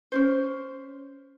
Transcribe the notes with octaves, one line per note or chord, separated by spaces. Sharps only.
C#4 D4 C5